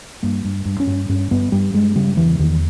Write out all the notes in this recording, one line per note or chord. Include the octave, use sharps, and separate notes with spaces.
G2 A#3
G2
G2
C#4
G2
G2 C#4
G2 B3
G2 G3
G2 G#3
C#3 G3
E2 E3
E2 D#3